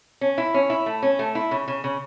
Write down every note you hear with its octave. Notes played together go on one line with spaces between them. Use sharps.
C#4
E4
C#4
E4
A3
C#4
A3
E4
C#3
C#3
C#3